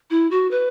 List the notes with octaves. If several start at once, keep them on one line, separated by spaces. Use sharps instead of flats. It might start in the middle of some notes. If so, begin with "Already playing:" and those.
E4
F#4
B4